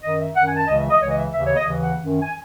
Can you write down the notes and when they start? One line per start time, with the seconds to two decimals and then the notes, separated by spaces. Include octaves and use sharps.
0.02 F#2 D#3 D#5
0.19 E5
0.35 F#2 D#3 F#5
0.46 G#5
0.56 A5
0.67 C#2 C#3 E3 D#5
0.79 E5
0.89 D#5
1.01 C#2 C#3 E3 C#5
1.09 D#5
1.16 E5
1.33 D#2 C#3 E3 E5
1.45 C#5
1.56 D#5
1.66 D#2 C#3 E3
1.82 F#5
2.00 F#2 D#3
2.22 G#5